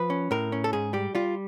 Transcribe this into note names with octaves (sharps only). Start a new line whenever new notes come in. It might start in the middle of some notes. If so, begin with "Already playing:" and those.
Already playing: F3 B4
C#4
A2 A#4
C#4
A4
G#2 G#4
G3 G4
G3 F4